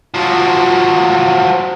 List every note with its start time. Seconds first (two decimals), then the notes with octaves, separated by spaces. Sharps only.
0.14 F3 F#3